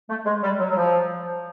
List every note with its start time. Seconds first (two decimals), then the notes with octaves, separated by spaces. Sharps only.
0.10 A3
0.26 G#3
0.43 G3
0.60 F#3
0.70 F#3
0.77 F3